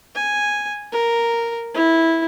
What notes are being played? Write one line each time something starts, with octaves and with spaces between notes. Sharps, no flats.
G#5
A#4
E4